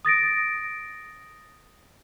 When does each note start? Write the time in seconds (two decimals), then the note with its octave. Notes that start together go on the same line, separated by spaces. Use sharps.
0.05 D#6 A6 A#6 D7